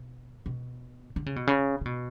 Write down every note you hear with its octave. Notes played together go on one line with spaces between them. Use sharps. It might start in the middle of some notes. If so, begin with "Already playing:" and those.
Already playing: B2
B2
D3
C#3
B2
C#3
C#3
B2